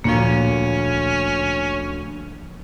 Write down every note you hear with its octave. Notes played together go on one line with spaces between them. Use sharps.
D2 A#2 F3 A#3 C#4